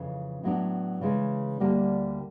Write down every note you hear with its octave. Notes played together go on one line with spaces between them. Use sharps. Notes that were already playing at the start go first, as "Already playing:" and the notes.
Already playing: F2 C#3 E3
A2 F#3 B3 D4
C#3 E3 G#3
D2 D3 G3 A#3